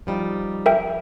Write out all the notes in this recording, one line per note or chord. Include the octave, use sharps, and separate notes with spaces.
F3 G3 D#4
A#4 E5 G5